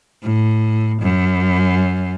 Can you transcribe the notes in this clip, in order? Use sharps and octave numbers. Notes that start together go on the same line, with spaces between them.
A2
F#2